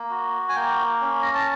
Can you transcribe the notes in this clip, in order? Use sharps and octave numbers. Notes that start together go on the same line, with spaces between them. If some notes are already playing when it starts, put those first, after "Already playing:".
Already playing: A#3
F#4
G#5
A#3 G5
C#4
A#5
A5